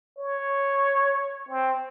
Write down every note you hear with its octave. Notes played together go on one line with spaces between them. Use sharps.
C#5
C4